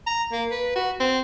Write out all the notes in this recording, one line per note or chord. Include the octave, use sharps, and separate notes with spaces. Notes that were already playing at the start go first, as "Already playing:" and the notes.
A#5
A#3
B4
F#4
C4